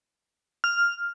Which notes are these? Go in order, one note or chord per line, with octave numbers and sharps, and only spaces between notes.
F6